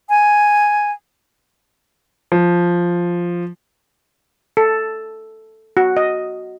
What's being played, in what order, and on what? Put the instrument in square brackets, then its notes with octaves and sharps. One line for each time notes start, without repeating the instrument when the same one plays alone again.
[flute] G#5
[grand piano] F3
[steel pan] A4
F#4
D#5